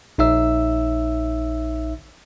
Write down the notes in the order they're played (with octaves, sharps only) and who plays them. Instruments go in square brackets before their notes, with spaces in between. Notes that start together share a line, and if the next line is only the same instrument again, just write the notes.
[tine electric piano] A#1 D#4 C#5 E5 E6